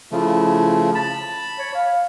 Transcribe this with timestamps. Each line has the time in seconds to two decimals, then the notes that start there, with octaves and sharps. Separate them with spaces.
0.12 C#3 F3 A3 E4
0.95 A5 B5
1.59 C#5
1.75 F5